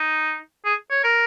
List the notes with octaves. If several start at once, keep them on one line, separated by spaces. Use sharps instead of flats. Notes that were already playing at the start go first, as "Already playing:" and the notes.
Already playing: D#4
G#4
C#5
A#4